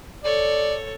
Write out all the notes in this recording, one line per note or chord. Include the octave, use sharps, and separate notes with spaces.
A4 C#5 D5